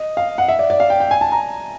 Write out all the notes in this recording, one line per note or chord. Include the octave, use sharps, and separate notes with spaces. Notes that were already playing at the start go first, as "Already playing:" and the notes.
Already playing: D#5
F5
F#5
E5
D5
D5
F5
G5
G5
G#5
A5
A#5